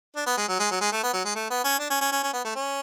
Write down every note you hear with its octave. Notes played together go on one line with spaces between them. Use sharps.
D4
B3
G#3
F#3
G#3
F#3
G#3
A3
B3
F#3
G#3
A3
B3
C#4
D4
C#4
C#4
C#4
C#4
B3
A3
C#4